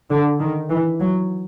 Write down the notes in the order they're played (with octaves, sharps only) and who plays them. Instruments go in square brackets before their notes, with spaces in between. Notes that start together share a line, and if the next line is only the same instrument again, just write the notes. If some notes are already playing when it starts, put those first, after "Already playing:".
[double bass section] D3
D#3
E3
F#3